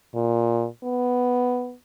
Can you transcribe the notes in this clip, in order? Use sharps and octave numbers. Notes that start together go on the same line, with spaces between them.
A#2
B3